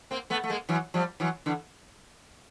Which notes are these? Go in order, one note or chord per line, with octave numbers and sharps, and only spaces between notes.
A#3 C4
A3 B3
A3
G#3 A#3
E3 F#3
F3 G3
E3 F#3
D3 E3